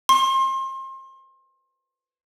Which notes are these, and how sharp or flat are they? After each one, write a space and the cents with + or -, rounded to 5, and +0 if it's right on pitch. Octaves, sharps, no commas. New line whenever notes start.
C6 +35